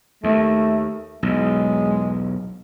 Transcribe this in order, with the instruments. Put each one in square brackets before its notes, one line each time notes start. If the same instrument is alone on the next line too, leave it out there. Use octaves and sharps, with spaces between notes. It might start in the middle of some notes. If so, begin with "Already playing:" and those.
[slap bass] D#2 [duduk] A3
[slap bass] B1 E2 [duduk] G#3